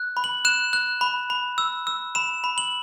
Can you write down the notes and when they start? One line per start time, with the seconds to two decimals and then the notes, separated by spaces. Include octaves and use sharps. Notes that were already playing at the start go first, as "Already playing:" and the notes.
Already playing: F#6
0.17 B5
0.24 F#7
0.45 F#6 E7
0.73 F#6
1.01 B5
1.30 B5
1.58 E6
1.87 E6
2.15 B5 E7
2.44 B5
2.58 F#7